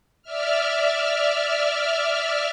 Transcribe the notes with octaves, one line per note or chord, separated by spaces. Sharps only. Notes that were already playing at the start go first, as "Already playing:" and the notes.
D5 E5 F6